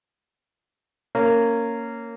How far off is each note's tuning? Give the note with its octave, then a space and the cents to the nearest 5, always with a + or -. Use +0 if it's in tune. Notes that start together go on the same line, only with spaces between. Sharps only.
A#3 -15 C#4 +0